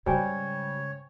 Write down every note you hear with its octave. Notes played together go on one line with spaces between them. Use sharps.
G#2 C#3 G3 C5 C#5 G5 G#5